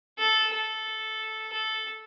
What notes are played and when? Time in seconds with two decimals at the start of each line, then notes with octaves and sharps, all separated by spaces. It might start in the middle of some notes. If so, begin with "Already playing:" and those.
0.19 A4
0.53 A4
1.53 A4